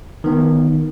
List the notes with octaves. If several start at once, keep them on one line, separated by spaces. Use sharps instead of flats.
D#3 B3